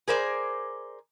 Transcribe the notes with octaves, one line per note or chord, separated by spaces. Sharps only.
G#4 A#4 C5 D5